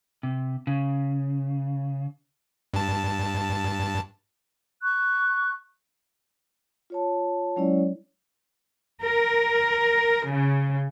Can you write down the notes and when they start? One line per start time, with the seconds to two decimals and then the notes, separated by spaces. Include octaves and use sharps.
0.23 C3
0.67 C#3
2.74 G2 A5
4.82 C#6 F#6
6.90 F4 C#5 A5
7.56 F#3 G#3 C#4 E4 C#5 D5
9.02 A#4
10.31 C#3